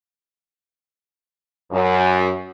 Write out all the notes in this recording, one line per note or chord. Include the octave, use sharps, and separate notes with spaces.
F#2